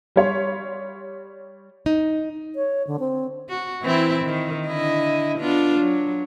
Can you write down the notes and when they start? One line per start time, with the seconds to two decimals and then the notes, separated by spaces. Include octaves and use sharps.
0.16 G3 C#5 C6
1.86 D#4
2.55 C#5
2.87 D3
2.99 C4
3.49 F#4
3.82 E3 C4 E4
4.25 D#3
4.67 D3 E4 D#5
5.39 B3 D4 F4
5.80 F#3